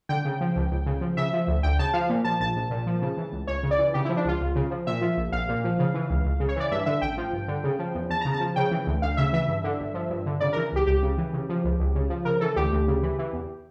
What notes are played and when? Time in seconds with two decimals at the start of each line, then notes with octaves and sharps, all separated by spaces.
0.09 D3 G5
0.25 C#3
0.41 F3
0.56 C#2
0.71 C#2
0.86 C#3
1.01 F3
1.17 C#3 E5
1.33 F3
1.47 D2
1.63 D2 G5
1.79 C#3 A5
1.94 F3 F5
2.09 A#2
2.24 F3 A5
2.40 A#1 A5
2.56 A#1
2.70 A#2
2.86 F3
3.02 C#3
3.17 E3
3.32 C#2
3.47 C#2 C#5
3.63 C#3
3.71 D5
3.79 E3
3.94 C#3 G4
4.05 F3 E4
4.17 D4
4.24 C#2 F4
4.41 C#2
4.56 C#3
4.71 F3
4.87 A#2 E5
5.01 F3
5.17 A#1
5.32 A#1 F5
5.49 A#2
5.64 F3
5.79 C#3
5.94 E3
6.10 C#2
6.25 C#2
6.40 C#3
6.49 C#5
6.56 E3 D5
6.71 G2 E5
6.86 D3 E5
7.02 A1 G5
7.17 F3
7.33 G2
7.48 D3
7.64 C#3
7.79 F3
7.95 E2
8.10 E2 A5
8.21 C#3 A#5
8.33 A5
8.40 F3
8.56 C#3 G5
8.71 E3
8.87 D2
9.02 D2 F5
9.17 C#3 E5
9.33 E3 E5
9.48 G2
9.64 D3
9.80 G1
9.94 F3
10.10 G2
10.26 D3
10.40 C#3 D5
10.53 E3 A#4
10.72 C#2 G4
10.87 C#2 G4
11.03 C#3
11.18 E3
11.33 C#3
11.49 F3
11.64 C#2
11.80 C#2
11.95 C#3
12.10 F3
12.25 C#3 A#4
12.41 E3 A4
12.56 D2 G4
12.72 D2
12.88 C#3
13.03 E3
13.19 E3
13.33 E2